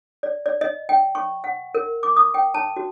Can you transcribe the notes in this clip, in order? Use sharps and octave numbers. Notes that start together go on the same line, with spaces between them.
D5
D5
D#5
G5
C#6
F#5
A#4
D6
D#6
G5
A5
F#4